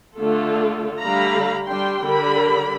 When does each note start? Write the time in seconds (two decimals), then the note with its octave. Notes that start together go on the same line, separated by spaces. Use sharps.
0.16 D3 A3 F4 A4
1.01 D3 G3 A3 F5 A#5 B5
1.67 G3 D4 G5 C6
2.05 D3 G3 A#4 B5